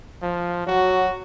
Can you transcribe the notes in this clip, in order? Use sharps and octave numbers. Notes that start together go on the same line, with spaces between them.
F3
F#3 F#4